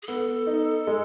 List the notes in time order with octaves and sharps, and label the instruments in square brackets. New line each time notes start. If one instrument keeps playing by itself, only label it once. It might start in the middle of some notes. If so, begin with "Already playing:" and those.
[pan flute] G#4
[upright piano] B3 [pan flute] A4
[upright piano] D#4
G#3